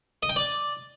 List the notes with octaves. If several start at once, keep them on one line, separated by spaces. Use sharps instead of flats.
D#5
G5
D5